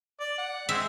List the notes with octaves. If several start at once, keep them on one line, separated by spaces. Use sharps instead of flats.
D5
F#5
G#3 C4 E5